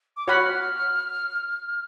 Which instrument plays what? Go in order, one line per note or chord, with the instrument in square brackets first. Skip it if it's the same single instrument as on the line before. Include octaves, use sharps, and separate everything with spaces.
[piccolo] D6
[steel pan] F#4 C#5 F#5 B5 [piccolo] F6